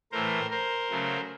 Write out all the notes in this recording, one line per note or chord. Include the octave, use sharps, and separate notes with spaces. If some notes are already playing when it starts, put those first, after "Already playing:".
A2 E3 A3 A#4 C5
A#4 C5
C#3 F#3 A3